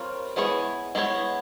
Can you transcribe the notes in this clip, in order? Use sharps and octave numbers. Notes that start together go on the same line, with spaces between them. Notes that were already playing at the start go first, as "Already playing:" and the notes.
Already playing: G3 C4 F4 A#4 C#5
G#3 B3 E4 G#4 C#5
G#3 B3 E4 G#4 C#5